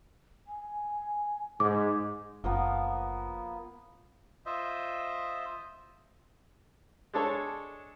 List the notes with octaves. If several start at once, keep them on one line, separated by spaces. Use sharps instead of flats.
G#5
G#2 D6
F#1 F3 A#3 B3
F4 C5 D#5 E5
G#3 D4 A4 C#5